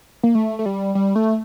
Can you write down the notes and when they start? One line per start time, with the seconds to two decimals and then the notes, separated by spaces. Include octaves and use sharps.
0.23 A#3
0.35 A3
0.59 A3
0.66 G3
0.95 G3
1.15 A3